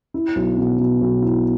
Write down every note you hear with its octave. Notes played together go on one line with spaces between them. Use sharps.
E4
B1
B2
B2
B1
E4